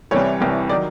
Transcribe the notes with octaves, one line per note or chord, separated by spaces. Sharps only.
C2 C3 E3 G3 C#5
C2 C3 E3 G3
D#3 F#3 D5